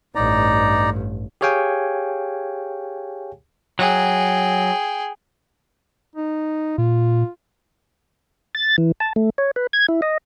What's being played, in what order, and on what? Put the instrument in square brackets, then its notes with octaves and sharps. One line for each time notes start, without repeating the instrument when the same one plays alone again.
[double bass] A1 G2 [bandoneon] D#4 D5 A#5
[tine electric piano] G4 G#4 C#5 F5 G5 G#5
[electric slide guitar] F#3 [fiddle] G#4 G5
[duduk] D#4
[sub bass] A#2 [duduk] F4
[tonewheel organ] A6
E3
A5
A3
C#5
B4
G#6
E4
D#5